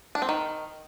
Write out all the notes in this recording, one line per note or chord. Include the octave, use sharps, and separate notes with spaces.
D4
C4
D#3